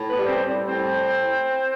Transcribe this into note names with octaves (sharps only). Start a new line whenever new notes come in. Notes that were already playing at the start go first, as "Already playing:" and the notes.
Already playing: A2
B3 B4
G3
C4 C5
G3
A2 C4 C5